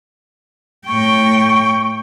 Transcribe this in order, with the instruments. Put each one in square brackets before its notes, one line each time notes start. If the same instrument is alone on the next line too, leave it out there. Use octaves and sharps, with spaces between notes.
[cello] A2 G5 [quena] C#6